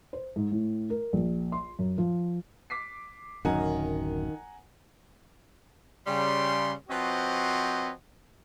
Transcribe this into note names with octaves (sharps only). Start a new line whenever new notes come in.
C5
G#2
A2
A#4
A#1
C6
F#2
F3
D6 B6 C7
D1 F#2 D#3 F#5 G#5 A#5
C#3 G3 C6
F3 C4 F#4 B4 C#5 D#5